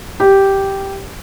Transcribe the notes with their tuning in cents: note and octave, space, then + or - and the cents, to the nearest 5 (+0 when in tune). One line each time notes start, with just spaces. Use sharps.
G4 -5